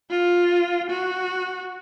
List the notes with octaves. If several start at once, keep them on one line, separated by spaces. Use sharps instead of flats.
F4
F#4